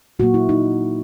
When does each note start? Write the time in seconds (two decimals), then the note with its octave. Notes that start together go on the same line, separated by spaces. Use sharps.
0.19 A#2 F#3 A#3 F#4
0.34 E4
0.49 D#4